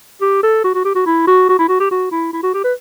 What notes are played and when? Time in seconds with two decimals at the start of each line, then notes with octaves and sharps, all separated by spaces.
0.22 G4
0.43 A4
0.65 F#4
0.75 F#4
0.85 G4
0.95 F#4
1.06 E4
1.27 F#4
1.49 F#4
1.59 E4
1.69 F#4
1.80 G4
1.91 F#4
2.12 E4
2.33 E4
2.43 F#4
2.54 G4
2.64 B4